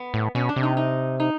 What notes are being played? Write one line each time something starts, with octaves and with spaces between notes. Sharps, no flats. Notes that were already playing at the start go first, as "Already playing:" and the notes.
Already playing: B3
A2
B2 C#4
D4
C3
D#4
D#4
D#4